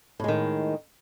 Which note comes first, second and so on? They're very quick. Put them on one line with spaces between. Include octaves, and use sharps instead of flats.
A2 G#3 D#3